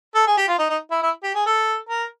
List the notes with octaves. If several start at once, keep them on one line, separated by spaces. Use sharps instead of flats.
A4
G#4
G4
F4
D#4
D#4
E4
E4
G4
G#4
A4
A#4